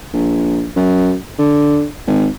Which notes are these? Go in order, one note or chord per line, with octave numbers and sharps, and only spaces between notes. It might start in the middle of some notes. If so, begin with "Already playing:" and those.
A#1
F#2
D3
G#1